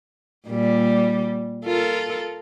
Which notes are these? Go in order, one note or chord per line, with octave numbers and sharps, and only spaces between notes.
A#2 G3
F4 A4 A#4